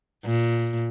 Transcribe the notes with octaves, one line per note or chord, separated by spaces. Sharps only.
A#2